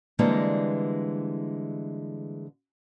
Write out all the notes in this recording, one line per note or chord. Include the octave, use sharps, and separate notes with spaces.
D3 E3 G3 G#3 A#3 C4